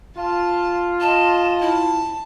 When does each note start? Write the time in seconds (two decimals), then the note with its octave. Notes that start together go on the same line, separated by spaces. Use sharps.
0.16 F4 A5
1.00 D#5 A5
1.61 E4 A5